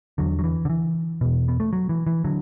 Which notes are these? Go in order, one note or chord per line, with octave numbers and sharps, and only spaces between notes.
E2 D3 F#3
F#3
E3
D3
E3
E2 B2
B3
A3
F#3
E3
E3
D3 F#3